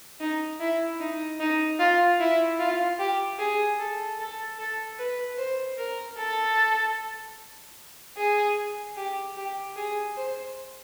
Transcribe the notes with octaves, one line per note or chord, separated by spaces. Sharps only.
D#4
E4
D#4
D#4
F4
E4
F4
G4
G#4
A4
A4
A4
B4
C5
A#4
A4
G#4
G4
G4
G#4
C5